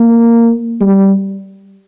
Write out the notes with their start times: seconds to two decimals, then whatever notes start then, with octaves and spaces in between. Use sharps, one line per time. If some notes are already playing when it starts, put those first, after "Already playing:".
Already playing: A#3
0.80 G3